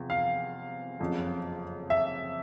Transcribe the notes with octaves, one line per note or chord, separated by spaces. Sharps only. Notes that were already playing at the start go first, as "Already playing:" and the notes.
Already playing: E2 C3 F3
F5
F#1 F2 C#3
E5